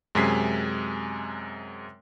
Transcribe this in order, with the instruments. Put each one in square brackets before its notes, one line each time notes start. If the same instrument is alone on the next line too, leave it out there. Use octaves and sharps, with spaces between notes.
[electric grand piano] F#2 C3 G#3 G#5 B6 C7